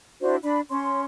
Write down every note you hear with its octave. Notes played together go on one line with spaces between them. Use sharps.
D4 E4 F#4 C5
D4 B5
C#4 C6